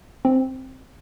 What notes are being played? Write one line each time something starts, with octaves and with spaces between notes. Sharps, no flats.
C4